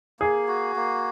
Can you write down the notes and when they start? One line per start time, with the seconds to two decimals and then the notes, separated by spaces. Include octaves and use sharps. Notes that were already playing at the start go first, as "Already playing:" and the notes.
0.20 A#3 G#4
0.48 F#4
0.76 A#3